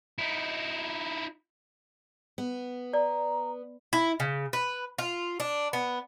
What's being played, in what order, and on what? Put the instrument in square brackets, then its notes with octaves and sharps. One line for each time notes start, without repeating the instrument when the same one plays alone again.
[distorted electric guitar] D#4 E4
[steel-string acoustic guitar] B3
[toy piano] D5 [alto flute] A#5
[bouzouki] E4
C#3
B4
F4
D4
B3